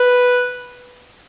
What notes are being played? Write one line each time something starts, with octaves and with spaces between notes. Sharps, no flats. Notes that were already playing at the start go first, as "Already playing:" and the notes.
Already playing: B4